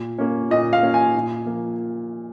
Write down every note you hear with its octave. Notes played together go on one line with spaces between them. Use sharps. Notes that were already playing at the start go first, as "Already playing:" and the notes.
Already playing: A#2
A#3 C#4
A#2 D#5
F5
A#3 C#4
G#5
A#2
F3 A#3